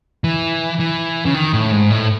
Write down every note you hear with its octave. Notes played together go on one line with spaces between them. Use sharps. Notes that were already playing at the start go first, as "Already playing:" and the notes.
E3
E3
C#3
D#3
A2
G#2
A2